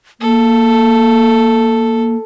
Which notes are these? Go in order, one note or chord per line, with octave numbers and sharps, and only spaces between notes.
A#3 A4